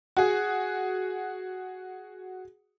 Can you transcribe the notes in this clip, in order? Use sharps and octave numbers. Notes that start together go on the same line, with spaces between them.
F#4 G#4